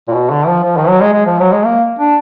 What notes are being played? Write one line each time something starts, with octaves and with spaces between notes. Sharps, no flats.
A#2
B2
D3
F3
F3
D#3
F#3
G#3
G#3
F3
F#3
G#3
A#3
D4